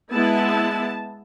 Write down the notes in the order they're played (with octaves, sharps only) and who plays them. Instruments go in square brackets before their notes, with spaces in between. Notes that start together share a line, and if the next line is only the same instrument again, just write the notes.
[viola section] G#3 B3 E4 A5